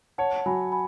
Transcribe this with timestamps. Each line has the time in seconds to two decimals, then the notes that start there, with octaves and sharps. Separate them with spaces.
0.18 C#5 F#5 A5
0.46 F#3 G#5 B5
0.72 G#5 B5